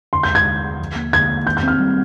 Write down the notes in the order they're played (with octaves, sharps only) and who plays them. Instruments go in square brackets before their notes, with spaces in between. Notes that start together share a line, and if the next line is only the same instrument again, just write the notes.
[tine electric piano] D3 [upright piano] C6
[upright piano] G6
[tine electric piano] D#2
[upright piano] G#6
[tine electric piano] D3
D#2
F3
A#3
[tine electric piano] D3 [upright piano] G#6
[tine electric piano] A#3
[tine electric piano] D#3 [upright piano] G6
[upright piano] G6
[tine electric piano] C4 [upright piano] F6
[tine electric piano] G3